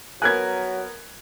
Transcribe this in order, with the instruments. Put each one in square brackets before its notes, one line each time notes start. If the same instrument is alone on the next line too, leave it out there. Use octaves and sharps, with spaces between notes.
[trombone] F#3 [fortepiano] B3 A#4 G#5 [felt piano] F#6 G#6